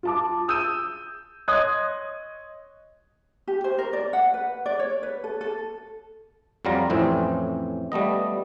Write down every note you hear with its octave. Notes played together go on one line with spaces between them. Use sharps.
F4 A5 D6
D#6 E6 G6 D#7
C#5 D#5 C6 D#6 F#6 G#6
G4
C5
A#4
D5
F#5
B4
D5
C#5
B4
A4
A4
F2 F#3 G3 F4 A#5
F2 A2 E3 C4 C#4
G3 A3 B3 D#5